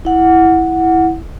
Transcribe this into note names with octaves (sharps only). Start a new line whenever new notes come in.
E4 F#5